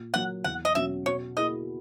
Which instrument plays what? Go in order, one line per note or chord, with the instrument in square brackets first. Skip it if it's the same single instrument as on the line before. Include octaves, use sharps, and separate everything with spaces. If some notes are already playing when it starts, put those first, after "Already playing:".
Already playing: [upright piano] A#2
[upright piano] F#3 A#3 [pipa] F#5
[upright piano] E2 [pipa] F#5
[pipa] D#5
[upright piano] B2 F#3 C#4 F#4 [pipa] E5
[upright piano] B2 [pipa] C#5
[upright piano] A#3 E4 G#4 [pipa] D#5